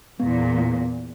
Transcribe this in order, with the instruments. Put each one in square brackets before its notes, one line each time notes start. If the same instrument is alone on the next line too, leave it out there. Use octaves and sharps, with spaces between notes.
[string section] E2 A#2 [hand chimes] B3